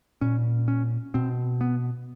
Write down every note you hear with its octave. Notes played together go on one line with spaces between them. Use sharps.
A#2 C#4
C#4
B2 C4
B3